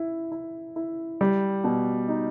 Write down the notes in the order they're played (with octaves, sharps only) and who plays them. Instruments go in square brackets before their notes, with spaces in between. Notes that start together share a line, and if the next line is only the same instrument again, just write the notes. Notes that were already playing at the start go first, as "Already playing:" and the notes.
Already playing: [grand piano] E4
E4
E4
G3
B2
D#4